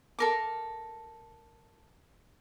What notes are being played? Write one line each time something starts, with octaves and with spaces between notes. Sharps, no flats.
A4 A#4 D6